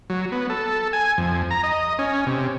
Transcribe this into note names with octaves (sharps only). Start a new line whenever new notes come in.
F#3
B3
A4
G#5
F2
A#5
D#5
C#4
C3